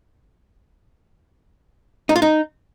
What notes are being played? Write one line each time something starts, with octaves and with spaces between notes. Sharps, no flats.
D#4
F4
D#4